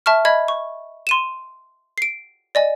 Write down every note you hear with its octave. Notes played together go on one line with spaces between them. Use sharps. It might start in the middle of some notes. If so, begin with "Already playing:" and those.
E5 A5 C#6 F6
D#5 E5 B5 G#6
C#6
C6 D#7 E7
C7 D7
D5 D#5 G#5